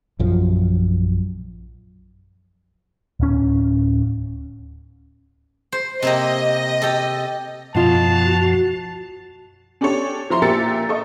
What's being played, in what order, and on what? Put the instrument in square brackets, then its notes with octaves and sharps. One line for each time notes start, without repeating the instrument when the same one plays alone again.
[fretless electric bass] A#1 F#2 F3
[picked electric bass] D1 C#4
[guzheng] C5
[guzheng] C3 A#3 G4 [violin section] D#5
[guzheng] G4 A4
[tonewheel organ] F#2 F3 [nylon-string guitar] B2 F4 [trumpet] A5
[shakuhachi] F#4
[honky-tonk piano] C#4 D4 G4 A4 C#5
F3 E4 A#5 C6
A#2 G4 A#4 E5 A6 C#7
A4 D#5 C#6